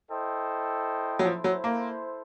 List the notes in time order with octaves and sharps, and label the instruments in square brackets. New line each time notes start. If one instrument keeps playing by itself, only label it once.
[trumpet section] E4 A4 C5 D#5 G5
[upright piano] F#3
[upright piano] F3 [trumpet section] E4 A4 C5
[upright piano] F#3
A#3